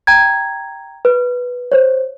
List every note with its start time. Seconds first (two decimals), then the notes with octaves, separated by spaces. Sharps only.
0.07 G5 A#5 G#6
1.05 B4
1.72 C5 C#5